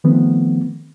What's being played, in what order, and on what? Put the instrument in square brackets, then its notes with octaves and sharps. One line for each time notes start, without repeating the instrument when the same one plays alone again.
[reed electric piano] D#3 F3 A3 B3 C4